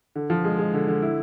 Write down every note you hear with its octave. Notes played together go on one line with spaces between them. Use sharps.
D3
F3
G#3
G#3
D3
D3
E4